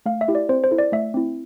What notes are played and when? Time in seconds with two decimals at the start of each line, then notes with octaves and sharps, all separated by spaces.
0.06 A3 F5
0.21 E5
0.28 E4 G4
0.35 D5
0.49 C4 C5
0.64 C5
0.71 E4 A4
0.79 D5
0.92 A3 E5
1.14 C4 E4